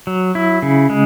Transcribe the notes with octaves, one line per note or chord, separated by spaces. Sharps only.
F#3
E4
C#3
G#3